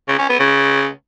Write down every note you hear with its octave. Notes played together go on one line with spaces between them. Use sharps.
C#3
C#4
B3
C#3